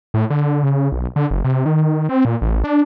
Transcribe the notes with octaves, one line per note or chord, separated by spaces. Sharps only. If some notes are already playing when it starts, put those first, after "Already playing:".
A2
D3
C#3
B1
D3
F#1
C3
D#3
C4
A#2
A1
D4